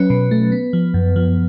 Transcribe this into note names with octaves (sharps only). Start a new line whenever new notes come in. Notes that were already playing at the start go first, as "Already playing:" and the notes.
Already playing: F#3 C#4 B4
B2
A3
B3
F3
F#2
F3